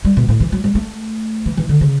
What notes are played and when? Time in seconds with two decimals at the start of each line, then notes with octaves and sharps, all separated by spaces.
0.05 G3
0.17 B2
0.28 A2
0.40 E3
0.52 F#3
0.64 G3
0.75 A3
1.46 E3
1.57 E3
1.69 D3
1.81 C#3